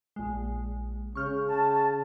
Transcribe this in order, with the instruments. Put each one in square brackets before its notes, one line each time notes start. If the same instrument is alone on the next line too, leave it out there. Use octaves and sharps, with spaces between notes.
[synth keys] A#1 G#3
[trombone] C#3 [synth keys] C#6 F6 G6
[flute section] A5